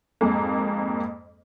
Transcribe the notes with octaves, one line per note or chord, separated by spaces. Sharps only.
F2 G#2 A#3